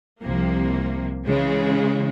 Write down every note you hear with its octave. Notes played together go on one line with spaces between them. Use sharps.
C2 C3 F3 A#3
C#3 E3 G#3